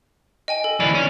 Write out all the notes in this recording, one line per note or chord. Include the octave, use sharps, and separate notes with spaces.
D#5 G5 G#5
A4
D2 E3 D5
C#4